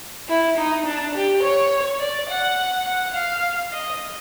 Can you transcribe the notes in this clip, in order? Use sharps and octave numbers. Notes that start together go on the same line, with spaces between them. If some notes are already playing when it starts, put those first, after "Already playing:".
E4
D#4
D4
G4
C#5
D5
F#5
F#5
F5
D#5